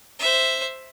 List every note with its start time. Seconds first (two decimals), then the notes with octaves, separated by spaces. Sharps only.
0.19 C5 E5